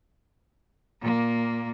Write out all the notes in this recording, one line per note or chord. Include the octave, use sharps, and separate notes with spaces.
A#2 A#3